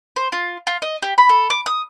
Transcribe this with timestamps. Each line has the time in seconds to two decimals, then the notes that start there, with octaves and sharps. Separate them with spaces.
0.16 C5
0.32 F4
0.67 F4
0.82 D#5
1.02 G4
1.18 B5
1.29 A4
1.50 D6
1.66 D#6